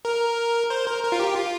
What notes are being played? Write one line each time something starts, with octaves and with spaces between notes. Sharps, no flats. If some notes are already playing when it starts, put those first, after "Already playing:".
A#4
C5
A#4
A#4
F4
G4
F4